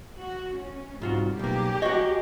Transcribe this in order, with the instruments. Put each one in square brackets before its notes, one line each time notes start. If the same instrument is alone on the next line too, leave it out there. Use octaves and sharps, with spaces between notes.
[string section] F#4
C#4
[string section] C2 [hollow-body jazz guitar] G#2 F4 F#4
[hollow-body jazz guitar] B1 A#3 [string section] G4 G#4
[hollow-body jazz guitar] F#4 C#5 [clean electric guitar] D#5